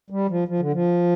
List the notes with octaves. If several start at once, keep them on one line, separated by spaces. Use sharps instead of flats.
G3
F3
F3
D3
F3